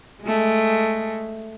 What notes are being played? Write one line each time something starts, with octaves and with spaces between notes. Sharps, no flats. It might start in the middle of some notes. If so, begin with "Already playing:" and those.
G#3 A3